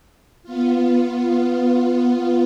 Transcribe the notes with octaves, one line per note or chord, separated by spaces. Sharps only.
B3 F4